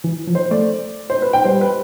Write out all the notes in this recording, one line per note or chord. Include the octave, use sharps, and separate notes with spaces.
E3
F3
C5
A3 D5
C5
B4
G5
G3 C5
B4